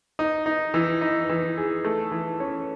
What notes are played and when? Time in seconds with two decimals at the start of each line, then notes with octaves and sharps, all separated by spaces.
0.19 D#4
0.46 D#4
0.74 E3
1.01 D#4
1.29 E3
1.58 G#4
1.85 A3
2.12 E3
2.40 C#4